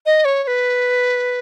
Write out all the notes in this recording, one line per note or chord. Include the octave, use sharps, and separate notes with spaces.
D#5
C#5
C#5
B4